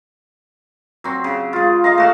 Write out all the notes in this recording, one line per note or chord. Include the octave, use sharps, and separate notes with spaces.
F#3 C4
C#3
G#3 F4
D#5 F5 A#5
A3 F#4 F5